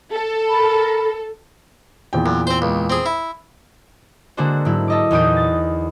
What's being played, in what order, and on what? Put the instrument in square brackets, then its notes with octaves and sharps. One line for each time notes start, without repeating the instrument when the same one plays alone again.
[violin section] A4
[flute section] A#4 B5
[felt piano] E2 A#2 G5
[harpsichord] F#2
C4 C5
C#2
C4 G#4
E4
[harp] D3 G#3 A#3 D4 F#4 C5
G#2 F#3 E4
A4 D#5 D6
E2 A#2 D#4 D#6 G6 D7
A6